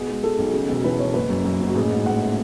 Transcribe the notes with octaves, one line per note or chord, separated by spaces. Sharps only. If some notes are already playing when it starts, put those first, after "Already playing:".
Already playing: B2 G#4
G#3
G#3 A4
B1
C#3
E1
E3 B4
E1 C#5
F#1 B4
F#2
F#2
F#1
F#4
A1 G#4
G#2
A1 F#5
A3